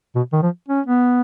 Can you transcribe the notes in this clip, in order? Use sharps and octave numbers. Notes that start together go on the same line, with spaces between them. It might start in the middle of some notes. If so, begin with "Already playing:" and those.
B2
D#3
F3
C#4
B3